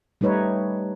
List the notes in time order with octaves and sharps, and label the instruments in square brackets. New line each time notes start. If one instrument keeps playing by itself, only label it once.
[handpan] G3 A3 D#4 B4 C#5